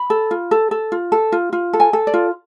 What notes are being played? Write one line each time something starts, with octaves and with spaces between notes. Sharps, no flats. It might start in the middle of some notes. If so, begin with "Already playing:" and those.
Already playing: B5
A4
F4
A4
A4
F4
A4
F4
F4
A4
G#5
A4
D5
F4